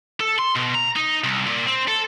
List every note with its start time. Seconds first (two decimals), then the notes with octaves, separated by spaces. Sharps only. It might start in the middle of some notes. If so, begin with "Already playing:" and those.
0.20 A4
0.39 C6
0.56 B2
0.75 A#5
0.96 D#4
1.24 C2
1.46 A#2
1.67 C4
1.88 A4